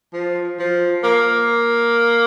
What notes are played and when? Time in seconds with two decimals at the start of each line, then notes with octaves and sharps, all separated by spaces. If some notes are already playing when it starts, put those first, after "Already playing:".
0.13 F3
0.59 F3
1.04 A#3